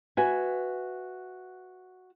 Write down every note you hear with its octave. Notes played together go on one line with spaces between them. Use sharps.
F#4 B4 E5 G#5